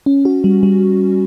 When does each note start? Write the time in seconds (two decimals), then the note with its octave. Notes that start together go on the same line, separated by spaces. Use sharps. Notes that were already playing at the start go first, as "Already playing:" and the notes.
0.06 C#4
0.25 F#4
0.44 G3
0.63 G3